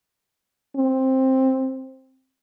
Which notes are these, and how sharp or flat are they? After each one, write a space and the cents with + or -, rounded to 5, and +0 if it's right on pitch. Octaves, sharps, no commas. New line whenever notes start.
C4 +10